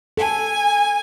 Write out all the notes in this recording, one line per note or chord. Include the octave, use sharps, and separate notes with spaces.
A4 G#5